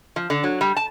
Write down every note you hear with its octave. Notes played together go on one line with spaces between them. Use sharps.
F3
D3
F#3
G3
A5